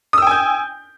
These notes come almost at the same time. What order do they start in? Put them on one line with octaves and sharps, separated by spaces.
D#6 E6 G5 G#5 G6